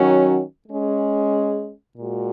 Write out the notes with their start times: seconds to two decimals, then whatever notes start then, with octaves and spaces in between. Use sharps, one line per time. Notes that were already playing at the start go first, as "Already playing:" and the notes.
Already playing: D#3 F#3 C#4 F#4
0.67 G#3 C#4 G#4
1.97 A#2 G#3 F#4